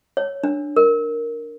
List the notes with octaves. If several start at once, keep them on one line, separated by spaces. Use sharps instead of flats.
C#5
D4
A#4